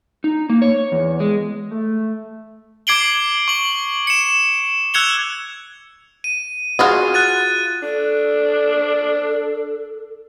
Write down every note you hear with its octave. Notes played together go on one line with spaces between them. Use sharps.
D#4
A#3
C#5
E2
G#3
A3
D6 G#6 C7 D7 F#7 G7
C#6 F#7
C#7 E7
E6 F#6 G#6 C#7 F7 G7
D#7
F4 F#4 G#4
F#6 A6 D#7
D4 A4